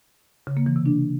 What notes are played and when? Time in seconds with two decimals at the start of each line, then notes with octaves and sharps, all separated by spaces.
0.47 C#3
0.57 A#3
0.66 E3
0.76 C3
0.86 D4